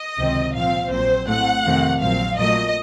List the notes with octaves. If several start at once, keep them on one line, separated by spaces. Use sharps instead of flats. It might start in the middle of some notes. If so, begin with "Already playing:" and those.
Already playing: D#5
C#2 C3 D#3 F#3 C4
A#2 F3 C4 F5
A#1 A#2 F#3 C4 C5
A2 A3 C4 F#5
F2 C3 D#3 A3 C4
A#1 A#2 F#3 C4 F5
A#2 F#3 A3 D#5